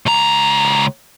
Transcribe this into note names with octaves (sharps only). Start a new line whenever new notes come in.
C#2 A#5